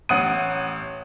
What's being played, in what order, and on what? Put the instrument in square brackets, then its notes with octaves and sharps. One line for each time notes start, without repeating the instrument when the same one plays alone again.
[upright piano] A1 F#5 D#6 D#7